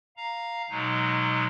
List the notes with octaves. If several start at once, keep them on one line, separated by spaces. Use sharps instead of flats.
F5 A#5
B2 F#3 G#3 D#4